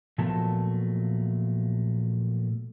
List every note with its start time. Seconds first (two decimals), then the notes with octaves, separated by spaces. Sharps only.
0.18 A#2 F3 F#3 A3 B3 A5